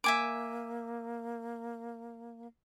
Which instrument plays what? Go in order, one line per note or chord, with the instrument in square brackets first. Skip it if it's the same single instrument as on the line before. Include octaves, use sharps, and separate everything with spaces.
[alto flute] A#3 [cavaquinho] E5 G#5 D6